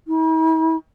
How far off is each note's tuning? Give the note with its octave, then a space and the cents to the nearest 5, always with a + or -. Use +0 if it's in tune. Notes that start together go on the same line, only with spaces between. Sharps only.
E4 -45